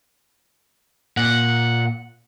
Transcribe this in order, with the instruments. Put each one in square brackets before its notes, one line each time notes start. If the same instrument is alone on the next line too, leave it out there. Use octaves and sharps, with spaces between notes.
[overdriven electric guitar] A#2 [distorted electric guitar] F#5